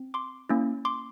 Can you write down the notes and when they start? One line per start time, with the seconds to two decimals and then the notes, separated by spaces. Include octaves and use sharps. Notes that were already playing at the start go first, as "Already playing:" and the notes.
Already playing: C4
0.14 C6 D6
0.49 A#3 C#4 E4
0.85 C6 D6